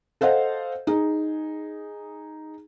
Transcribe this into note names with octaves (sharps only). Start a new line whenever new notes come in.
A4 C5 D#5 F5 F#5
D#4 G#4